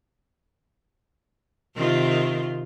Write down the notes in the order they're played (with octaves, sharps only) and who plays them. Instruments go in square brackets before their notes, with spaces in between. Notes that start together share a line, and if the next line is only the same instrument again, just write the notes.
[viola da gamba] C3 D#3 F4